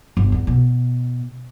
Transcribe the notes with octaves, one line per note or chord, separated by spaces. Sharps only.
G1
E2
B2